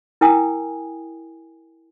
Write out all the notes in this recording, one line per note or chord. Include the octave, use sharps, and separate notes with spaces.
E4 A#4 G5 G#5 D#6